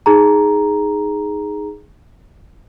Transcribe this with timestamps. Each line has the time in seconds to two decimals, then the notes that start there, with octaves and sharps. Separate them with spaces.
0.06 D#4 G#4 A#5